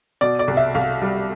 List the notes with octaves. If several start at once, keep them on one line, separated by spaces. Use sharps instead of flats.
B2 D5
D5
C2
E5
C2 F5
G3